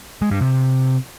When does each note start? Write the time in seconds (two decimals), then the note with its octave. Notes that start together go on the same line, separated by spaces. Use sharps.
0.22 G#3
0.31 G2
0.41 C3